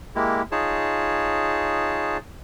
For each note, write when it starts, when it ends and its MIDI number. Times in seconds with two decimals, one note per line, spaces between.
0.15 0.42 56
0.15 0.42 58
0.15 0.42 64
0.15 0.42 67
0.52 2.17 63
0.52 2.17 65
0.52 2.17 68
0.52 2.17 73
0.52 2.17 81